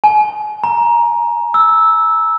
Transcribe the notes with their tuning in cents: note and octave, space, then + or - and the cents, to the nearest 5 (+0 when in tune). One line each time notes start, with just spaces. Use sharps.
G#5 +35
A#5 +15
E6 -10